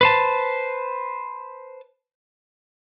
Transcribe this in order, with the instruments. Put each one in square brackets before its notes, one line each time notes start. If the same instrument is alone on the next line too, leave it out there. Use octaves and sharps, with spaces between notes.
[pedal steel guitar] B4 C5 A5